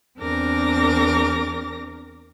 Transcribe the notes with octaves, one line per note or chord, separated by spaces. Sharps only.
E2 C4 D4 A#4 D6 A#6